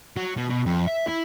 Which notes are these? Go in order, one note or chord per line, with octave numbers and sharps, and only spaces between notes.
F#3
B2
B2
F2
E5
E4